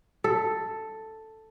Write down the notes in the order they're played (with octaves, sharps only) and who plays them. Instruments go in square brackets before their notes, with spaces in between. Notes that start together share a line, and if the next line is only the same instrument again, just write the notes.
[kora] A4